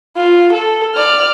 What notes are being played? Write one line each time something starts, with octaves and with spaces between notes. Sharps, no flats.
F4
A4
D5 F6